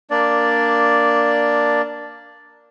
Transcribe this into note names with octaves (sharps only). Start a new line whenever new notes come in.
A#3 D4 D5